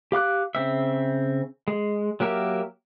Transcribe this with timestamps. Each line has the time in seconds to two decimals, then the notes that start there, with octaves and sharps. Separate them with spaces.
0.12 G4 F5 D6 F#6
0.55 C#3 C4 E5
1.68 G#3
2.20 F#3 A#3 G4 A#4 E5